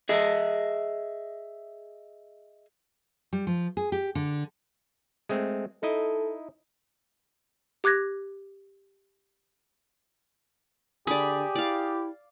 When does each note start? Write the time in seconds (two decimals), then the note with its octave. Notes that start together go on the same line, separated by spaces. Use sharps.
0.09 G#4 D#5 E5
3.33 G3
3.47 F3
3.77 G#4
3.92 G4
4.15 D3
5.29 G#3 A3 C4
5.83 D#4 E4 A4 D#5
7.84 G4 D6 F#6 G#6 A#6
11.07 D3 G4 G#4 D5 B5
11.55 E4 D5 F5